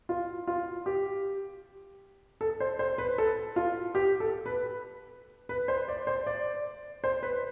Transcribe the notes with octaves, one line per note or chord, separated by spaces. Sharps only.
F4
F4
G4
A4
C5
C5
B4
A4
F4
G4
A4
B4
B4
C5
D5
C5
D5
C5
B4